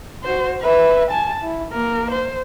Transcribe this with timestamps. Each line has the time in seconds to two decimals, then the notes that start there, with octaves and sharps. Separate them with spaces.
0.24 F#4 C5
0.61 B4 E5
1.11 G#5 A5
1.43 E4
1.72 A#3 A#4
2.11 C5